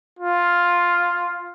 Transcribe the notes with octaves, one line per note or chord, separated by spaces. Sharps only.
F4